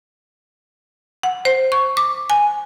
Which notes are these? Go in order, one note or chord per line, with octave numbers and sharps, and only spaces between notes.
F#5
C5
C#6
D6
G#5